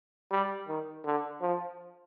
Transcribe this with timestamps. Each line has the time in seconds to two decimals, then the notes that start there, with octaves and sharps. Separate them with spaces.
0.31 G3
0.68 D#3
1.04 D3
1.41 F3